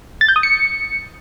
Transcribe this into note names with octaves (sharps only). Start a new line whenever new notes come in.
A6
G6
D#6
C#7